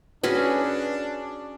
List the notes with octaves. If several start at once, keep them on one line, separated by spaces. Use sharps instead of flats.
C#4 D4 F#4 G#4 B4